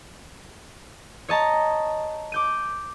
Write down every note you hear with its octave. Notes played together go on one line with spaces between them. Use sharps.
C#5 D#5 A5 A#5
D6 G6 D#7